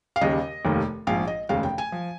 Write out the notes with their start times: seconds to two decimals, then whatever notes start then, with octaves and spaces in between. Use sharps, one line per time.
0.16 F5
0.21 D#2 C#3 G3 D#5
0.65 F1 D#2 D#3 G3 A#3
1.07 A#1 G#2 F3 F5
1.27 D#5
1.49 F1 D#2 C#3 G#3 F5
1.63 G5
1.78 G#5
1.92 F3